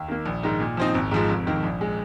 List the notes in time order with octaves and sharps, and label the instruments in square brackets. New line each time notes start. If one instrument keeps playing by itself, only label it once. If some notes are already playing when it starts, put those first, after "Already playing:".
Already playing: [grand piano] D#2
D#3 A#3
A#1
G#2 D#3
A#2
F3 C4 D#4
G#1
G#2 F3 G#3
F1
D#2 D#3
A#1
G#3